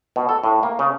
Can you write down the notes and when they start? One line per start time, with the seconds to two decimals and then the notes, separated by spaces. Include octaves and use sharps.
0.16 B2
0.29 A4
0.44 A2
0.63 A#3
0.79 C#3